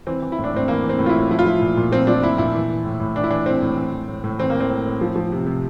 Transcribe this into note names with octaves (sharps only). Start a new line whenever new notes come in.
E3 C4
E3
E4
A2
D4
A2 C4
E3 A#3
E3
C4
A2
F4
E4
A2
F3 E4
F4
F3 E4
A#2
A#2
F3 C4
F3 D4
A#2 E4
A#2 E4
E3
E3
A2
A2
E3 D4
E4
E3 D4
A2 C4
A2
E3
E3
A2
A2
E3 C4
A#3
E3
C4
A2
A2
F3
F3
C3
C3